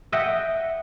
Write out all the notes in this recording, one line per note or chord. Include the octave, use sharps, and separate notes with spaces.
D#5 E5 F#5 G5